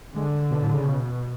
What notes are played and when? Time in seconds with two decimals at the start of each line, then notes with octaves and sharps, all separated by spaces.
0.16 D3 G#3
0.51 B2
0.62 A2
0.74 C#3
0.86 B2